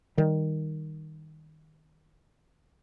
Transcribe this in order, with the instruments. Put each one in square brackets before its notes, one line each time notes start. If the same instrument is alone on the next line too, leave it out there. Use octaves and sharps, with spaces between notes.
[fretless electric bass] D#3 G3